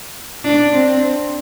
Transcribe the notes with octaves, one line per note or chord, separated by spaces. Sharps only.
D4
C4